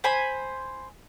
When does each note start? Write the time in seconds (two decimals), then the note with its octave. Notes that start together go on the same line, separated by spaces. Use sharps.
0.04 C5 G#5 B5